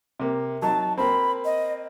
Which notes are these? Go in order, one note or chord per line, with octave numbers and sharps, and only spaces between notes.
C3 A#3
F#3 D#4 A5
A#3 C4 B5
D#5